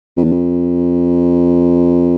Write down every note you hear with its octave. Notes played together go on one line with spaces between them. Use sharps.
F2
E2
F2